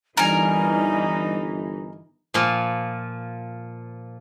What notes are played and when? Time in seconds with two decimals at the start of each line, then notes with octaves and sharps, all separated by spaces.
0.17 G1 E3 G3 D#4 A#4 G#5
2.34 A#2 F3